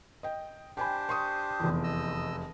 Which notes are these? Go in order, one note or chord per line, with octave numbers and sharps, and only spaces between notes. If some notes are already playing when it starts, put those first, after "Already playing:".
D#5 G5
D4 G4 C5 G5 G#5 B5
C6 C#6 D#6
F1 E2
D#5 E6